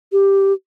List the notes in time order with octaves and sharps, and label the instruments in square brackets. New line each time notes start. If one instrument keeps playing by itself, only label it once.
[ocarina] G4